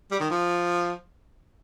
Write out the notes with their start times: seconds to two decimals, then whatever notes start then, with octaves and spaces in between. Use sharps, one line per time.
0.11 G3
0.20 D#3
0.30 F3